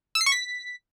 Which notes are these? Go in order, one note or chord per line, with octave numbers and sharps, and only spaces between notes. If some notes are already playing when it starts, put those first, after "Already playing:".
E6
C7
C#6
B6